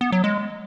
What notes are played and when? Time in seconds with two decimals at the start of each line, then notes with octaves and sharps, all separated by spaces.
0.01 B3
0.12 F#3
0.24 G#3